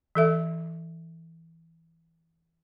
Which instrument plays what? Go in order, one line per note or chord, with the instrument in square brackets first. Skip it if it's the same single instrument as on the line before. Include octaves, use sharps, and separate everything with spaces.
[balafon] E3 A4 E5